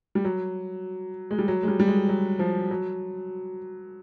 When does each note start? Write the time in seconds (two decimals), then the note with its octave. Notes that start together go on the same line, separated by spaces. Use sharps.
0.15 G3
0.25 F#3
1.31 G#3
1.38 G3
1.48 F#3
1.63 G#3
1.68 G3
1.80 G3
1.88 G#3
2.09 F#3
2.39 F3
2.71 F#3